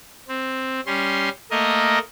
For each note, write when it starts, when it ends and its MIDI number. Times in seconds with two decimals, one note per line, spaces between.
0.28 0.80 60
0.86 1.29 55
0.86 1.29 61
0.86 1.29 84
1.51 1.99 57
1.51 1.99 58
1.51 1.99 70
1.51 1.99 75